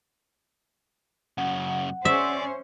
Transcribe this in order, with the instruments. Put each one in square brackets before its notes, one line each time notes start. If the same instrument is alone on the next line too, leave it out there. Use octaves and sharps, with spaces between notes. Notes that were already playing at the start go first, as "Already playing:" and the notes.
[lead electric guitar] F#2 C#3 [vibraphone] F#5
[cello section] C#4 C5 [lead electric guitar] D5 [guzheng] E5